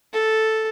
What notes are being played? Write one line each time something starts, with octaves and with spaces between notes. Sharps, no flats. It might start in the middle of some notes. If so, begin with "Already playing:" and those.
A4